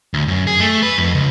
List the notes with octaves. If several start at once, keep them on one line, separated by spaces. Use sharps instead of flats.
D2
F#2
G#4
A3
B4
F2
C#2